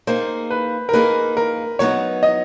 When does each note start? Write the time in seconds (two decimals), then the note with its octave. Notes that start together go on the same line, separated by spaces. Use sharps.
0.07 A#3 D#4 G#4 C5
0.50 B4
0.89 A#4
0.93 A#3 D#4 G#4 B4
1.37 A#4
1.79 F#3 B3 D#4 C#5
2.23 D#5